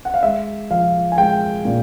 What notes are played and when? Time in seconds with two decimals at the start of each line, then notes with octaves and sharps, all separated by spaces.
0.05 F#5
0.14 F5
0.23 G#3 E5
0.70 F3 F5
1.12 G#5
1.18 G#3 G5
1.65 A#2